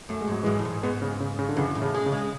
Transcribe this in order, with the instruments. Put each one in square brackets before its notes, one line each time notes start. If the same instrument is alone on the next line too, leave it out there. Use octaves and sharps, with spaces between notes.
[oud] F#2 [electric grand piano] A3
[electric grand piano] G#3
[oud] G#2 [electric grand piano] F#3
[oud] G#2 [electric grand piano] E3 G#3
[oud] A2
G#2
[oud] G#2 [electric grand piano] G#3 B3
[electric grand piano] C#3
C#3
C#3
D3
[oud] F#2 [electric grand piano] C#3 E3
[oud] A2
[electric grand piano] C#3
[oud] G#3
[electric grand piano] C#3
[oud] G#3